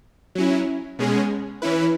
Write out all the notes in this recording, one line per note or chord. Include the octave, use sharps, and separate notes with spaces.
F#3 C#4 E4
B2 G#3 C#4 G#4
E3 C#4 E4 B4